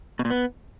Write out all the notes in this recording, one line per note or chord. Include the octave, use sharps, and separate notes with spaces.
B2
A#2
B3